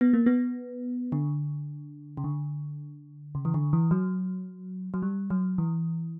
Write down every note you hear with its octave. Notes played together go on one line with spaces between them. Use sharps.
B3
A#3
B3
D3
C#3
D3
C#3
E3
D3
E3
F#3
F#3
G3
F#3
E3